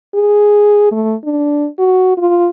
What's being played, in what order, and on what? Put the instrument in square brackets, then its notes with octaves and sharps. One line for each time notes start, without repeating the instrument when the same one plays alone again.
[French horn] G#4
A3
D4
F#4
F4